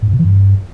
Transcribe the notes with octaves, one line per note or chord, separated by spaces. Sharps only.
G#2
G2
B2
E3
G2